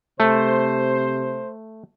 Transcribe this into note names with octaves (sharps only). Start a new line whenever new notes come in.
C3 A3 C5